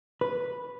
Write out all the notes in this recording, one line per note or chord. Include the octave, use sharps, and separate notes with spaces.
B4